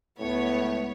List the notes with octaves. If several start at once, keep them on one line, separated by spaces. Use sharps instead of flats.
C#2 A2 B3 C#5